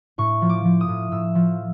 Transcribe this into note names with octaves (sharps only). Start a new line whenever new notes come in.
A2 C#6
F3
D6
F3
D#6
A2
A2 E6
F3